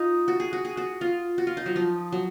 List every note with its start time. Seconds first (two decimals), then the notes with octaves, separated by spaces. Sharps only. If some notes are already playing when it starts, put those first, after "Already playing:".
Already playing: D#4 F4
0.28 F#4
0.40 G#4
0.53 F#4
0.65 G#4
0.77 F#4
1.01 F4
1.38 F#4
1.47 F4
1.57 D#4
1.66 F#3
1.76 F3
2.12 F#3